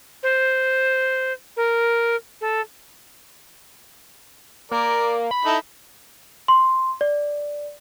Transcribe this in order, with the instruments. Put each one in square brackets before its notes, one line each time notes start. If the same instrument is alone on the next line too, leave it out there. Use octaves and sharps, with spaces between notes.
[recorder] C5
A#4
A4
[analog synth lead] A#3 [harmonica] A#4 D5
[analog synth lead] B5
[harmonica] D#4 E4 A4
[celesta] C6
D5